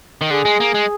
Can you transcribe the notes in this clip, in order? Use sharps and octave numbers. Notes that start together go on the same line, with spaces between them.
D#3
D3 G#4
G#3
A#3
G#3